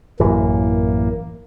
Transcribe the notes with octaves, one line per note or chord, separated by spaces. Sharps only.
A1 F#2 E3 A#3